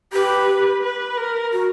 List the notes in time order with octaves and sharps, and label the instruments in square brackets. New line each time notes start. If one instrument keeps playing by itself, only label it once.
[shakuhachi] G4 [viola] B4
[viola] B4
A#4
[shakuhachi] F#4